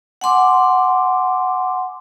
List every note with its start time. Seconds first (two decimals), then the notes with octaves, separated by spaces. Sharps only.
0.21 F#5 G#5 C6 D6